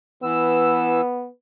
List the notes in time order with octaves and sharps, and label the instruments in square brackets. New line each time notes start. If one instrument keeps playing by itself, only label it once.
[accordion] E3 E6 [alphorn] B3